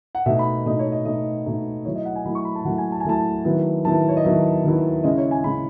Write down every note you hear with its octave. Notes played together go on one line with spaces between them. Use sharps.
F#5
B2 A3 D#4 E5
B5
B2 A3 D#4 D#5
C#5
D#5
B2 A3 D#4 D#5
B2 A3 D#4
F#3 A3 E4 C#5
D#5
F#5
G#5
F#3 A3 E4 B5
C#6
B5
A5
F#3 A3 E4 F#5
G#5
A5
G#5
F#3 A3 E4 A5
D#3 F#3 B3 E4
D#3 F#3 B3 E4 A5
C#5
D#5
D#3 F#3 B3 E4 E5
D#3 F#3 B3 E4
C#3 G#3 C#4 E4 D#5
C#5
G#5
C#3 G#3 C#4 E4 B5